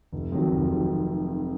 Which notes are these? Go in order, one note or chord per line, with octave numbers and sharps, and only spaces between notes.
F1
F2 D#3 F#3
F1
D#3 F#3